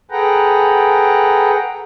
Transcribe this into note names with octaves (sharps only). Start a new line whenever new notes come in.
G#4 A4 B4 F#5 G5 A#5